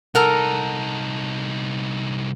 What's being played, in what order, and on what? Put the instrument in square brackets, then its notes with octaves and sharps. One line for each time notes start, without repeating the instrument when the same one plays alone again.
[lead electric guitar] C2 D#4 [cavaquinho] A4 A#4 F#5